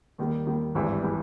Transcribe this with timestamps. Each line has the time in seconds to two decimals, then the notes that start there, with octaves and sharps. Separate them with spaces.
0.18 D#2 D#3 G3
0.47 D#2 D#3 G3
0.75 G#1 G2 E3 G3
1.03 E3 G3